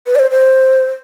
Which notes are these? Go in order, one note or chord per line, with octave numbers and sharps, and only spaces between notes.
B4
D5
C5
C5